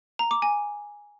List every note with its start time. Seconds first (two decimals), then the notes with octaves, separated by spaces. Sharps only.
0.19 A#5
0.31 D6
0.42 G#5